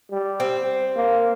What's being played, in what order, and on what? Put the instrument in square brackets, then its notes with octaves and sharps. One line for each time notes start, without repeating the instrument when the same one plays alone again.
[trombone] G3
[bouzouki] C4
[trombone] A#3